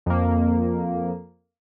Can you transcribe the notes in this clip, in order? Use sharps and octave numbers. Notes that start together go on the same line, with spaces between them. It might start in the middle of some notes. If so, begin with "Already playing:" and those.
F2 A#3